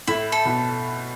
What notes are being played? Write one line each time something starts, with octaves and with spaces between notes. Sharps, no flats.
A2 E4
A4
B2